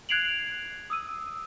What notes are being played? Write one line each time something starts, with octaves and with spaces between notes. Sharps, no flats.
F#6 G#6 C7 D7 F7 F#7
D#6 E6 D#7